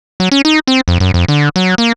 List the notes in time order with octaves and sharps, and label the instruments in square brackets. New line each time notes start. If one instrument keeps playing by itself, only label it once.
[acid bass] F#3
C#4
D#4
C4
F2
F#2
F2
D3
F#3
A#3